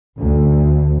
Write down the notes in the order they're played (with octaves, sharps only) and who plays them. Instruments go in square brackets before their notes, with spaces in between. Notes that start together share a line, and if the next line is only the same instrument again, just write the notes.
[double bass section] D2